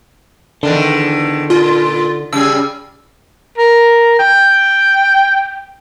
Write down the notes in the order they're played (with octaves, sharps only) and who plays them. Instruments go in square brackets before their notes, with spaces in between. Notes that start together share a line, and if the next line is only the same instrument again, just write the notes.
[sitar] E2 D#3 D4 [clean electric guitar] D3
[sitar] A#2 [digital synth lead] F4
[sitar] C#3 G3 G#4 [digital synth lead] E6
[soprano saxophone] A#4
G5